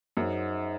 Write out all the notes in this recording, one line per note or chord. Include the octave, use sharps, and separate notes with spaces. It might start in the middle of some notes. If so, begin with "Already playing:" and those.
F#2 D#4 G#4 C5 D#5 F#5